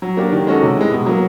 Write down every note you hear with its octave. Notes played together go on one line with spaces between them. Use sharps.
F#3
A#3 D4 G4
D#3
G#3 C#4 F#4 A4
C3
E3 G#3
B2
F#3 A#3